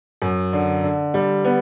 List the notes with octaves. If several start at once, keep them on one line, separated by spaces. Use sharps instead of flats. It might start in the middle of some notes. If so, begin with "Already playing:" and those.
F#2
D3
D3
G3
B3